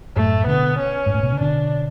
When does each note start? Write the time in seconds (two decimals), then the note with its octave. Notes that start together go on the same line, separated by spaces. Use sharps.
0.16 F#2 A2 A3
0.47 B2 D3 B3
0.79 C#4
1.06 G#2
1.14 A2
1.23 B2
1.32 C#3
1.41 B2 D3 D4